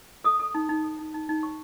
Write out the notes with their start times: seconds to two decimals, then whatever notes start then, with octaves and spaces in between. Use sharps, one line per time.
0.24 A4 D#6
0.40 A4
0.54 D#4
0.69 D#4
0.84 A4
0.99 D#4
1.14 D#4
1.29 D#4
1.43 D#4 C#6